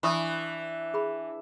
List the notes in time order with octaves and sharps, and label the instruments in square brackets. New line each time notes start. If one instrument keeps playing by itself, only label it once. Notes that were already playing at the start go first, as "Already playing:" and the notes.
[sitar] E3 [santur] D4 E5 [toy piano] B5 C#6 D#6
[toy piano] G#4 B5